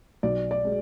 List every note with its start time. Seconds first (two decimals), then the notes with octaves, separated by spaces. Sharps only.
0.23 B1 D5
0.51 D5
0.65 G#3